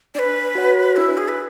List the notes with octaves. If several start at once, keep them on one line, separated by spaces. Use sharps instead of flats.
D4 B4 D5
F#4 C#5 F#5
D4 E4
G#4
B4